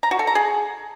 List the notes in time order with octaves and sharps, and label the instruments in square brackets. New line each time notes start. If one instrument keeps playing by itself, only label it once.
[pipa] A#5
F#4
A4
A#5
G#4